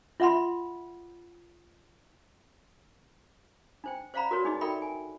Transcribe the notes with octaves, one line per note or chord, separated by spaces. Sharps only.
F4 E5 F#5 B5 C6
D4 C5 G5
C5 D5 F5 F#5 A#5 B5
F#4 A#4 B4 C#5 D5
D4 D#4 G#4 D5 D#5
A4 A#4 D5 E5 G5 B5
G#5